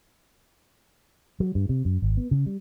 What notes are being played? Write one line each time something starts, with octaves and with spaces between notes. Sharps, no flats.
F#3
G2
C3
F#2
G#1
B3
C#3
G3